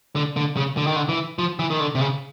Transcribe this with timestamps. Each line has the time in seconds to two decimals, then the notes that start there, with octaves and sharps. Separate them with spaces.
0.16 D3
0.37 D3
0.57 C#3
0.77 D3
0.87 D#3
0.96 D3
1.09 E3
1.39 F3
1.59 E3
1.70 D#3
1.80 D3
1.95 C3
2.01 C#3